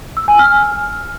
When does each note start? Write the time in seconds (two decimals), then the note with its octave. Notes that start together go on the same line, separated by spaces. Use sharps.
0.17 E6
0.28 G#5
0.39 F6